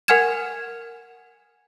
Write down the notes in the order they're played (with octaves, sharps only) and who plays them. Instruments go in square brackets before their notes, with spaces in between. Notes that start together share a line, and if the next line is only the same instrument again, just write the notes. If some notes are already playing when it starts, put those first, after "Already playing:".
[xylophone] A#4 F#5 G#5 F6 G#6 E7